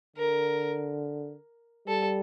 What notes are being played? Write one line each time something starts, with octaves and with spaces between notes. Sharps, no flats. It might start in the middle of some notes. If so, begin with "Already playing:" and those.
D3 A#4
G3 A4